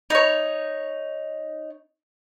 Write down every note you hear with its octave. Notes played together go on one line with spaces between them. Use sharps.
D#4 C#5